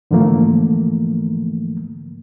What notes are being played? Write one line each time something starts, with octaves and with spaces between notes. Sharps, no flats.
G#2 D3 E3 F3 A3 A#3